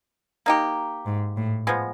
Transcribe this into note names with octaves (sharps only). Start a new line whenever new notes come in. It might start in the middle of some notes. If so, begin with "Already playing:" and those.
A#3 D#4 G4
G#2
A2
F3 G#3 B3